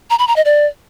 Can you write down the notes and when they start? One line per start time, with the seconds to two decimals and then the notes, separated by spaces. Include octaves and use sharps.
0.10 A#5
0.19 B5
0.28 A#5
0.36 D#5
0.45 D5